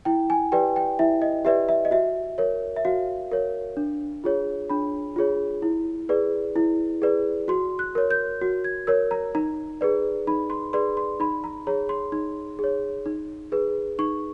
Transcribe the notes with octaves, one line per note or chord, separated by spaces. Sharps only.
E4 G5
G#5
G4 B4 D5 G5
G5
E4 E5
D#5
G4 B4 D5 E5
E5
D#5
F#4 E5
A#4 C#5
E5
F#4 F5
A#4 C#5
D4
F4 G#4 C#5
D4 B5
F4 G#4 C#5
E4
G#4 B4 D5
E4
G#4 B4 D5
F#4 C6
F#6
A#4 C#5
G6
F#4
G#6
A#4 C#5 E6
A#5
D#4 A#5
G#4 B4 D5
D#4 B5
C6
G#4 B4 D5 C6
C6
D#4 B5
A#5
G#4 C#5 A#5
C6
D#4
G#4 C#5
D#4
G#4 B4
D#4 C#6